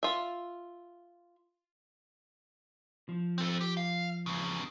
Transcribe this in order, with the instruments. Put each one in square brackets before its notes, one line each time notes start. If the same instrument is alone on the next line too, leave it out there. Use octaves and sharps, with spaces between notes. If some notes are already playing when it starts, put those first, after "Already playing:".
[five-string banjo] F4 E5
[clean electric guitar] F3
[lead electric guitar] C4 A4
G4
F5
E2 C#3